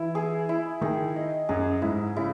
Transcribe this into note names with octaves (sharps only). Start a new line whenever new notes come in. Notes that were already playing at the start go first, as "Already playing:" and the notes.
Already playing: E3 E4
G#4
E4
D#3 G#4
D#5
F#2 G#4
G#2 E4
C#3 E4